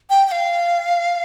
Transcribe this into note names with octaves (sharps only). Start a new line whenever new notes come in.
G5
G5
F5